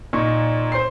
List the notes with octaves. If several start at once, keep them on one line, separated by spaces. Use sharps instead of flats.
A#2 D#4 C#6
C5 C6 C7